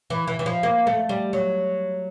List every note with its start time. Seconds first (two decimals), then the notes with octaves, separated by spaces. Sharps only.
0.10 E3
0.27 E3
0.39 E3
0.46 F3
0.63 A#3
0.87 A3
1.09 G3
1.33 F#3